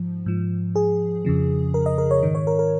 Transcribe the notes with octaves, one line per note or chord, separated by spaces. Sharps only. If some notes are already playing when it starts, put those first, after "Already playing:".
Already playing: G#2 F3
G#2 F3
G#4
F2 C#3 F3
A#4
D#5
A#4
C#5
G#2 D#3
C#5
A#4
A#4